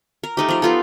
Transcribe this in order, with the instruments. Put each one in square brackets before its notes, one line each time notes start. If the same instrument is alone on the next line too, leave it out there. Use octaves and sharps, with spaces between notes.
[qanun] A#4
A3 D#4 G4
F3 A#4
B3 F4 A4